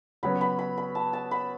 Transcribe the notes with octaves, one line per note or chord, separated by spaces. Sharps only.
C#3 F#3 B3 F#4 C#5 B5
B5
B5
B5
A5
A5
B5